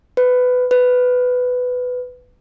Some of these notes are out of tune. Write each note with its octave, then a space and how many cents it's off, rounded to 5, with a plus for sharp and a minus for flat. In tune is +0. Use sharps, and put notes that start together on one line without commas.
B4 +15
B4 +10